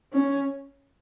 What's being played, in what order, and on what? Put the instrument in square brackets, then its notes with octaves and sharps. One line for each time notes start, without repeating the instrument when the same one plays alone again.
[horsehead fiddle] C#4